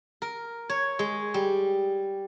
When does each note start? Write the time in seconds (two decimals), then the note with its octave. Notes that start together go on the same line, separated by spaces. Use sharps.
0.22 A#4
0.69 C#5
0.99 G#3
1.34 G3